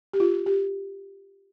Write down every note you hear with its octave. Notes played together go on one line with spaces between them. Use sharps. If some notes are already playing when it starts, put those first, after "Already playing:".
G4
F4
G4